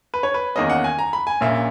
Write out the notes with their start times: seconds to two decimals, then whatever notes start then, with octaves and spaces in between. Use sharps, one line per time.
0.14 B4
0.23 C#5
0.34 B4
0.56 E2 D#3 A#3 C#4 D#5
0.70 F#5
0.84 G#5
0.99 A#5
1.13 B5
1.27 G#5
1.41 A#1 A#2 A#3 C#4 E5